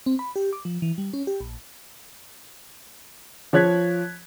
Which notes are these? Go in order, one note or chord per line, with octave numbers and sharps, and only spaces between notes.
C4
B5
G4
D6
F3
E3
G3
C#4
G4
A#1
F3 C#5 F#6 G#6 B6